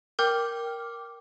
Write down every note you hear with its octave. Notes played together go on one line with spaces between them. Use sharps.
A#4 G5 D6 F6 G6